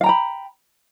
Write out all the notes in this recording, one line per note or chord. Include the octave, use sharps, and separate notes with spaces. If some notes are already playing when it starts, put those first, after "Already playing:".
F5 G5 A#5 B5